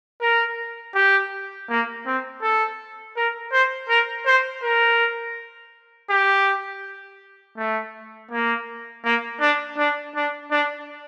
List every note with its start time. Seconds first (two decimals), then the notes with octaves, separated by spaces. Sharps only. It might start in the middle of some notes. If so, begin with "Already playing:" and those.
0.21 A#4
0.94 G4
1.69 A#3
2.06 C4
2.42 A4
3.16 A#4
3.52 C5
3.89 A#4
4.26 C5
4.63 A#4
6.10 G4
7.57 A3
8.31 A#3
9.04 A#3
9.41 D4
9.77 D4
10.15 D4
10.51 D4